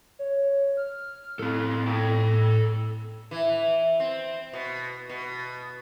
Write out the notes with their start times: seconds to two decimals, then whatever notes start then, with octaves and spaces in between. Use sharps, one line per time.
0.19 C#5
0.77 F6
1.39 A2 C4 A4
1.88 A4 G5
3.31 E3
4.00 C4
4.53 B2
5.10 B2